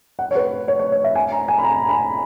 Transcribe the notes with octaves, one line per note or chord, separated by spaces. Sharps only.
F#5
C#5
B4
C#5
C#5
C#5
E5
G#5
A#5
G#5
B5
A#5
B5